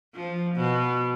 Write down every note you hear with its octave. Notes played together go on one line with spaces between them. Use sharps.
F3
B2